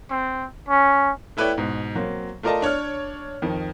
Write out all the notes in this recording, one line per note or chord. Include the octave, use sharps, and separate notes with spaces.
C4
C#4
A3 E4 B4 C#5 D5 G5
G#2 B2
F#3 A#3 C4
A3 F4 A#4 D5 D#5 A5
D4 C#5 C#6 F6
F2 D#3